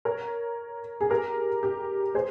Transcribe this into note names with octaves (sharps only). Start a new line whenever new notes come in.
A#4 C#5
G#4
G4 A#4
G4
G#4 C5